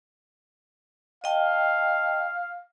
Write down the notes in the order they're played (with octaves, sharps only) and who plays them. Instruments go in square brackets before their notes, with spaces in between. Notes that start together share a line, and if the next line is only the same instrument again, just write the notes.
[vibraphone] D#5 G5 A5 [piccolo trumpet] F5